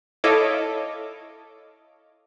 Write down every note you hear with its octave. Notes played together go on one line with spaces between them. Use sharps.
E4 A4 C#5 D#5 F5 D6